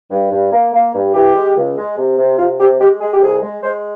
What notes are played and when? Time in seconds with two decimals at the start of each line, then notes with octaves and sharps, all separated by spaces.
0.11 G2
0.31 G2
0.53 A#3
0.73 A#3
0.94 G2
1.14 E3 G4
1.35 G#3
1.56 C#2
1.77 G#3
1.97 C3
2.17 C3
2.38 C3 F4
2.60 C3 G4
2.80 G#3 G4
3.01 G#3 G#4
3.12 G4
3.22 C2 G#4
3.42 G#3
3.63 G#3 C5